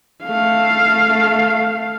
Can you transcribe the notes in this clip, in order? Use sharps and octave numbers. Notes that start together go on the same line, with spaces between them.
A3 F5